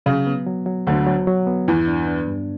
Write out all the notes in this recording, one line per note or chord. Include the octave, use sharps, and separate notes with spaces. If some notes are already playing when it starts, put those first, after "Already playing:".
C#3 F#3
B3
F#3
F#3
D2 D3 F#3
F#3
F#3
B3
E2 G2 E3
D4
D4
G2